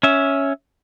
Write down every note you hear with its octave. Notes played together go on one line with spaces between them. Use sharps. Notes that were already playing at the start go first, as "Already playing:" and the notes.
C#4 E5